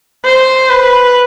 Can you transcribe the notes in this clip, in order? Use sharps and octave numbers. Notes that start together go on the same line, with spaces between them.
C5
B4